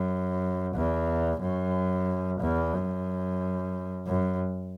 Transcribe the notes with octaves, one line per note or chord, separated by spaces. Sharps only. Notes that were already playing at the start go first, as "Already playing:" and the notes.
Already playing: F#2
E2
F#2
E2
F#2
F#2